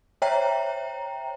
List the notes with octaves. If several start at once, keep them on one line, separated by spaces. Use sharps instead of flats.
C5 C#5 E5 G5 A#5